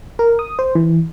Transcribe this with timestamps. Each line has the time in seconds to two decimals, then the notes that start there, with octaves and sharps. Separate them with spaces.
0.19 A#4
0.39 D#6
0.59 C5
0.75 E3